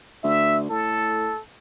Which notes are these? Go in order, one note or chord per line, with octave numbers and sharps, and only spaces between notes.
D2 E5
A2 A4